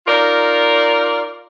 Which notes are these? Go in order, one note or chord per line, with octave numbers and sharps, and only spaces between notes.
D#4 F4 A#4 D5